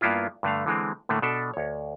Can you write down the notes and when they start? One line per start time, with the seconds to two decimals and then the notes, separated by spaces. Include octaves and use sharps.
0.01 G2 A#3 B3 E4 F4
0.43 G2 D3 A3 F5
0.66 D3 E3 G#3 C4
1.09 A2 D3 A3 A#3
1.22 B2 D4 A4 E5
1.54 D2 C#5